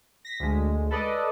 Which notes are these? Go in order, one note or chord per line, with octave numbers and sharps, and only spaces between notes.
A#6 B6
D2 G#3
A4 B4 D5 D#5